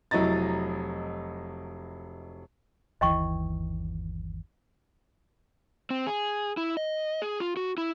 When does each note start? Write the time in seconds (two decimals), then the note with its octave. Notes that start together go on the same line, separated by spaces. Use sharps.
0.11 F1 F#3 E4 D#5 A#5 A6
3.01 G1 D#2 E3 D#5 G5 C#6
5.90 C4
6.07 G#4
6.57 E4
6.77 D#5
7.22 G#4
7.40 F4
7.57 F#4
7.78 E4